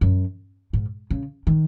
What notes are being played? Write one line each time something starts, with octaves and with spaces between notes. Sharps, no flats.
F#2
G#2
C#3
D#3